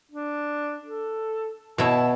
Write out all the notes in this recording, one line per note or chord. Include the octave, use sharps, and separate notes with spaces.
D4
A4
B2 E4 C#5 A5